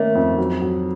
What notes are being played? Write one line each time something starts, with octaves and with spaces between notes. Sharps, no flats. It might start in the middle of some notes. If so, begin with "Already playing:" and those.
Already playing: D#3 A3 A#3 C#4
F2
F#3
F#3